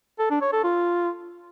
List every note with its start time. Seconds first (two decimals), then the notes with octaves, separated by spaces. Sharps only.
0.19 A4
0.30 D4
0.42 C#5
0.53 A4
0.64 F4